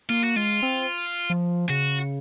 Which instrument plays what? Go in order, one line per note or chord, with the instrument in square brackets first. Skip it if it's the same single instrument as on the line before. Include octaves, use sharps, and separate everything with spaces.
[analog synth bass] A#3 [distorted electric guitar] F4
[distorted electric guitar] F#4
[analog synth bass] G#3 [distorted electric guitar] F4
[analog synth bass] C4
F3
[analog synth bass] C#3 [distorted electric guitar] F#4